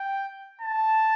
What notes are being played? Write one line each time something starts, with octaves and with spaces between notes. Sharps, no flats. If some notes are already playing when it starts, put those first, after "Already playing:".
Already playing: G5
A5